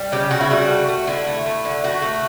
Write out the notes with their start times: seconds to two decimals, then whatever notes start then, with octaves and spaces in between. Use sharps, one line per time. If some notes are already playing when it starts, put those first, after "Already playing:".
Already playing: G3
0.12 C#3 G4
0.31 C#3 F#4
0.41 E4
0.50 G3 F#4
0.69 A3
0.89 A3
1.07 D3 E4
1.27 A3
1.46 A3
1.65 D3
1.84 A3 F#4
2.02 A3